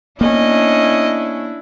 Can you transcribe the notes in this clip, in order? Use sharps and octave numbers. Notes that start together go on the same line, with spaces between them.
A#3 B3 C#4 D4 E4 D#5